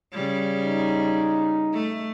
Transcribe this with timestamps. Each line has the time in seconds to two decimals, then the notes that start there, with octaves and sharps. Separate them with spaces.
0.13 C#3 G3
0.64 D#4
1.73 A3